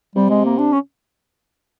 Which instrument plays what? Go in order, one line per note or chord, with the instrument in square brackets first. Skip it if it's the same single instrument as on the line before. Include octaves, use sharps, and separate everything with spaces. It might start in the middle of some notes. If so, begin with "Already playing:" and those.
[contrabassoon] C3 [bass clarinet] G3
[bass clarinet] G#3
A#3
D4
C#4